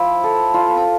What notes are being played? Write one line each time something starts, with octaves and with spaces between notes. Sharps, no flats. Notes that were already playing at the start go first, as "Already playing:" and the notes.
Already playing: F3 E4
A4
F4
B3
C4